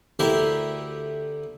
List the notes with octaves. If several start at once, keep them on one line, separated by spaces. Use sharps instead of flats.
D2 E4 G4 A#4 C5 E5